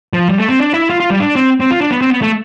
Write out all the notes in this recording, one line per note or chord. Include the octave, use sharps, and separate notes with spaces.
F3
G3
A3
C4
D4
E4
F4
F4
G3
D4
C4
C4
F4
D4
B3
C4
B3
A3